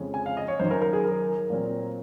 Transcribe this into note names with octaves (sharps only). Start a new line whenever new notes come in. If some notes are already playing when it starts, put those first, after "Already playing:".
Already playing: F2 C#3 G#3 C#4
G#5
F5
D#5
C#5
F#2 D#3 F#3 C5
A#4
A#4
G#4
A#4
A#2 F#3 C4